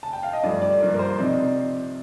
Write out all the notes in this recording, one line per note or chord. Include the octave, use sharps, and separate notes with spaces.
A5
G5
F5
D#5
G2 F3 A3 D5
D5
G2 F3 A#3 D5
A#4
C5
C3 F3 C4 D#4 D5